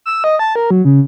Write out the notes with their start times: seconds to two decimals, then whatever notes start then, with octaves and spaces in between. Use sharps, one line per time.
0.06 E6
0.24 D#5
0.39 A5
0.56 A#4
0.71 F#3
0.85 C#3